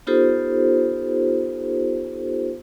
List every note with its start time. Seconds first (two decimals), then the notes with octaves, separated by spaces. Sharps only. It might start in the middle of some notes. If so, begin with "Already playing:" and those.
0.07 B3 D#4 F4 G4 A4 C5